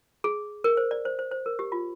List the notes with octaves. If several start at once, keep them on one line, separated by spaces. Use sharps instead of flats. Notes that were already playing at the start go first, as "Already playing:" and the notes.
G#4
A#4
C5
D5
C5
C5
C5
A#4
G4
F4